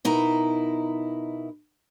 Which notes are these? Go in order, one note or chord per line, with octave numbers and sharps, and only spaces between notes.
B2 D#4 E4 A#4 A#5